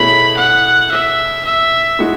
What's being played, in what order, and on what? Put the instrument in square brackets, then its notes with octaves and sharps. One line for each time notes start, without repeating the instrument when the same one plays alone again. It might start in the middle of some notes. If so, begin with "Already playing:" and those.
Already playing: [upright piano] B2 A3 C#4 E4 G#4 [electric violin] B5
[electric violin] F#5
E5
E5
[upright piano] A2 G#3 D#4 F#4